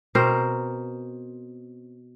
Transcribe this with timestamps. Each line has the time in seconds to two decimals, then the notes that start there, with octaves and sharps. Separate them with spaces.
0.15 B2 C4 A#4 C5